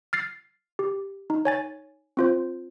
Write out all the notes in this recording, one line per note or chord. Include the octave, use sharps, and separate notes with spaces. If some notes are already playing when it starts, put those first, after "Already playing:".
F6 A6 C7
G4
D#4
C#5 G#5 A6
C4 F4 C5